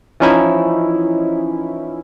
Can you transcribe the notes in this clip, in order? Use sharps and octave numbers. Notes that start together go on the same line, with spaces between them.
E3 F3 C#4 D#4 E4